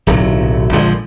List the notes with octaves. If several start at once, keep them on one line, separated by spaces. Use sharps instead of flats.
D1 B1 C3 F#3
A#1 D3 F3 G#3